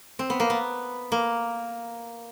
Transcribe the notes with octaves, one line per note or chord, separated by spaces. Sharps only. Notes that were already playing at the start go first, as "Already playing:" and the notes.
C4
B3
A#3
B3
A#3